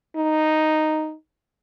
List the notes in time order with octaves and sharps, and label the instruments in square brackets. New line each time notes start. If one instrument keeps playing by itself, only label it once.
[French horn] D#4